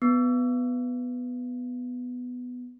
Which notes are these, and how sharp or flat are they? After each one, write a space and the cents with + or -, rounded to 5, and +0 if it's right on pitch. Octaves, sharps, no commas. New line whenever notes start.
B3 +5